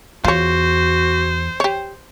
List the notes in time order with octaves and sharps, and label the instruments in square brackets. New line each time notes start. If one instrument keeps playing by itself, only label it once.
[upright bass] E2 [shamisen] F4 C#5 [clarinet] F#4 [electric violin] C5
[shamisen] G4 C#5